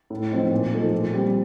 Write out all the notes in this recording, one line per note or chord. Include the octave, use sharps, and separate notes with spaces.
A2
F3 C4 D#4
A#2
F3 A3 D#4
A#2
G3 C4 G4